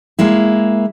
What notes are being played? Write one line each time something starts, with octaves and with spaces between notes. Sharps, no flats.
G#3 A#3 E4